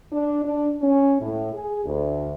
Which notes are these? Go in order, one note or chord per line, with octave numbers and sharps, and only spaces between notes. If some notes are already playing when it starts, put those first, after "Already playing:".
D4
D4
C#4
A2
G#4
D2